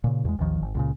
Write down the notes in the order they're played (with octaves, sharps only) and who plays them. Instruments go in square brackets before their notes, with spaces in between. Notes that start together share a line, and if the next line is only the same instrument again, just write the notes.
[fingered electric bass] A#2 C#3
E2 G#3
A1 D#2 D#3 F3
G#1
C#2 A#2 C#3